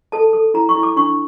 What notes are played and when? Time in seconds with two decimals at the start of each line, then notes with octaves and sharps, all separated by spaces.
0.12 A4 A5
0.33 A4
0.54 E4 A#5
0.69 C#6
0.75 E4
0.83 D6
0.96 D4 C#6